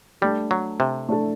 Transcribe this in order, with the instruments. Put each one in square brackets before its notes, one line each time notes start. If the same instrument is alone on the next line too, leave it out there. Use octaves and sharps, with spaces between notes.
[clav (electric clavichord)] G3 [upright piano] A3 D4 A4
[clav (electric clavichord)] F#3
C3
[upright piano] A3 D4 A4